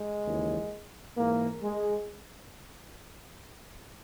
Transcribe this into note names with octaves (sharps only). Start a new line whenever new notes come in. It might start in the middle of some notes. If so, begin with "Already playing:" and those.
Already playing: G#3
D#2 C#3 E3
G#2 E3 A#3
G#3